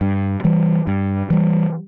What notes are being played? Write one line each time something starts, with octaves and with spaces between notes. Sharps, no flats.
G2
E3 G3
G2
E3 G3